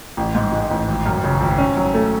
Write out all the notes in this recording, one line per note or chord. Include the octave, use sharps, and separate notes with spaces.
A1
G#2
G#3
A1
G#1
F#2
C#3
G#1
C#4
F#3
A3